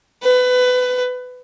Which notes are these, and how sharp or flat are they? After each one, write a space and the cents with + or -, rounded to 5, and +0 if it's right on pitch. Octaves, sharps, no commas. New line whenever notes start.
B4 +20